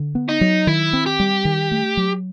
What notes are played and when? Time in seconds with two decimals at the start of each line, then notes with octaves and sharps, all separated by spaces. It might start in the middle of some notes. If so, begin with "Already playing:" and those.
Already playing: D3
0.15 B3
0.29 D#4
0.41 F#3
0.67 D#3 E4
0.93 C4
1.06 G4
1.20 G3
1.45 D#3
1.71 A3
1.97 F#3